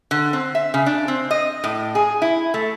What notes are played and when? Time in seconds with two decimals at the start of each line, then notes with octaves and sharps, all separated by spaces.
0.11 D3
0.33 C4
0.55 E5
0.74 C#3
0.86 D4
1.08 C4
1.31 D#5
1.64 A2
1.95 G#4
2.22 E4
2.54 A3